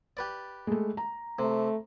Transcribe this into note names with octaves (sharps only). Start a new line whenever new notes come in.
G4 B4 D5
G#3 A3
A#5
C3 A3